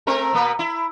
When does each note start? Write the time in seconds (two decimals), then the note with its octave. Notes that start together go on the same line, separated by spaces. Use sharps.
0.07 A3 C4 A#4
0.33 B2 A#3 B4
0.59 E4